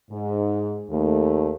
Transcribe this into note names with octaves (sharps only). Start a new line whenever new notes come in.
G#2
D#2 A3